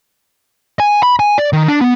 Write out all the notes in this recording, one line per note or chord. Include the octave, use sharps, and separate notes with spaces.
G#5
B5
G#5
D5
D#3
D4
B3